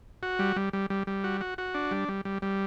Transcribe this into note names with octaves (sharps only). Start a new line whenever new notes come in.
F#4
G3
G3
G3
G3
G3
F#4
F#4
F#4
D4
G3
G3
G3
G3